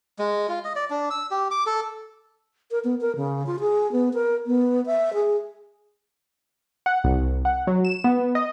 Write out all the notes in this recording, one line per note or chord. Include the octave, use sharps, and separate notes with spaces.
G#3
F4
D#5
D5
D4
E6
G4
D6
A4
A#4
B3
A#4
C#3
F4
G#4
B3
A#4
B3
E5
G#4
F#5
C2
F#5
F#3
E7
B3
D#5